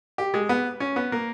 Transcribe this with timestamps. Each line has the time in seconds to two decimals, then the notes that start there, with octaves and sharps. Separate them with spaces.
0.18 G4
0.34 G#3
0.49 B3
0.80 C#4
0.96 B3
1.12 A#3